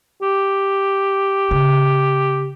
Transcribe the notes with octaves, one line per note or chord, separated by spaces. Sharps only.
G4
C#3